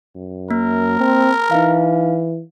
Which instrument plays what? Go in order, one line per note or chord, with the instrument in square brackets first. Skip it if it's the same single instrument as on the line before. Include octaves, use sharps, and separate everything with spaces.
[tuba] F#2
[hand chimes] A#3 [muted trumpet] A#4
[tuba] C4
[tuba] E3 [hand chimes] D#4 F5